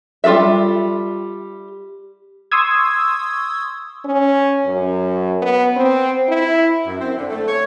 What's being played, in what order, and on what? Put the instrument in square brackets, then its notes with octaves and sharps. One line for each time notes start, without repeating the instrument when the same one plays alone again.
[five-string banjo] G3 F4 G#4 A4 E5
[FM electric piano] C6 C#6 D#6 E6 G#6
[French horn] C#4
F#2
B3
C4
E4
[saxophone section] F#2
C4
D3
A3
C#5